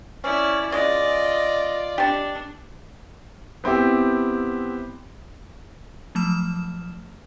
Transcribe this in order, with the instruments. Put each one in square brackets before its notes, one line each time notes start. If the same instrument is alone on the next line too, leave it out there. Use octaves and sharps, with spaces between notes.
[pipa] C#4 [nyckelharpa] E4 D5
[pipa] C#3 G#3 [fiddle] F4 D5 [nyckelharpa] D#5
[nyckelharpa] D4 [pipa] G4 A5
[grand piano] B3 C4 E4 G4
[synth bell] F3 F#3 A3 A5 F6 E7